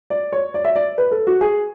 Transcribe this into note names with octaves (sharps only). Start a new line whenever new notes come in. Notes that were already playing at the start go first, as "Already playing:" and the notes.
D5
C#5
D5
E5
D5
B4
A4
F#4
G#4